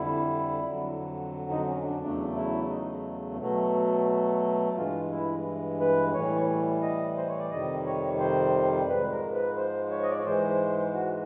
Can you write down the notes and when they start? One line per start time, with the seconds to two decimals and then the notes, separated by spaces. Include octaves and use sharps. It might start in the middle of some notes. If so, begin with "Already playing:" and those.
Already playing: F2 D3 G3 E4
0.63 F2 D3 F#3
1.50 D#4
1.68 C#4
1.84 D4
2.01 E2 C#3 F#3 A3 D4
2.36 E4
2.69 D#4
3.39 B2 F#3 A3
4.77 G2 E3 G#3 F4
5.11 E4
5.80 B4
6.13 A2 E3 G3 C#5
6.82 D#5
7.17 C5
7.29 C#5
7.39 D5
7.51 F2 C3 D#3 G3 D#5
7.86 C#5
8.20 C5
8.88 G#2 F3 G#3 B4
9.11 A#4
9.34 B4
9.57 C5
9.91 C#5
10.03 D#5
10.10 D5
10.18 C#5
10.25 G#2 E3 G#3 C5
10.94 F#4